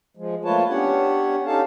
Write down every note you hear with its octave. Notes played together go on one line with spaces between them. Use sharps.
F3 G#3
A3 A#3 F4 B4 C#5 A5
B3 C#4 D4 G4 C#5 F#5
C#4 D#4 G4 A4 F5 A5